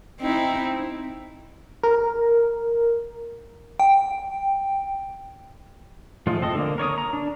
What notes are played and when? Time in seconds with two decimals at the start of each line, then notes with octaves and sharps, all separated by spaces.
0.20 C4 D#4 E4
1.84 A#4
3.80 G5
6.27 F3 G#3 A3 F4
6.42 C4 A4 D#5
6.55 D3 A#3
6.78 A#4 C#5 D5 D#6
6.98 A#5
7.13 D4